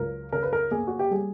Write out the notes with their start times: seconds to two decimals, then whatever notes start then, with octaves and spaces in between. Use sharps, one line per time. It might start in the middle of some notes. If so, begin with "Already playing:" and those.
Already playing: C#2 F#3 A#4
0.32 C#3 A#4
0.43 B4
0.53 A#4
0.71 A#3 G#4
0.87 F#4
0.99 G4
1.11 G3 G#4